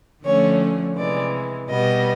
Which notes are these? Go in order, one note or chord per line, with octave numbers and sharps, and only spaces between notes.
D3 F3 A3 C#4 C#5
C3 E3 G#3 D5
B2 G3 B3 D#5